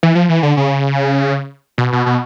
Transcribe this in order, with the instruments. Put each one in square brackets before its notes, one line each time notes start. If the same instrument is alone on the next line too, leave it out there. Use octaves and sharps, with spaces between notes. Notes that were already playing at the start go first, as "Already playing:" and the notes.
[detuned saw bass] E3
F3
E3
D3
C#3
B2
B2
B2